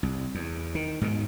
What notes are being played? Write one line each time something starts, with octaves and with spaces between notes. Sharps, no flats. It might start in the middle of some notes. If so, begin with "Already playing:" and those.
C2
E2
D#3
G#2 B2 D#3